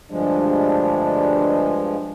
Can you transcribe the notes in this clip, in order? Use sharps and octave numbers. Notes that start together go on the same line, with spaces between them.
D2 G2 F3 G3 G#3 D4